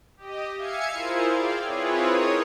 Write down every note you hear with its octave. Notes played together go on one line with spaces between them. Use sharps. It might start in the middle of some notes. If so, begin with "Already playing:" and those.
G4 D#5
E5 F5 G#5 G#6 C#7
E4 F4 G#4 A#4 C5
D5 F5 G5
C4 E4 F4 G#4 B4 C#5
D#4 A#4 C#5 D#6